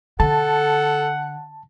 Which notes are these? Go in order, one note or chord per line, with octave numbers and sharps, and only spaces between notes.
D3 A4 F#5 A5